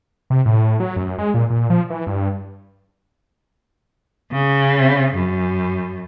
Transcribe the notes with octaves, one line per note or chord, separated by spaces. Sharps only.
C3
A2
F#3
F#2
G#3
A#2
A#2
F3
E3
G2
C#3
F#2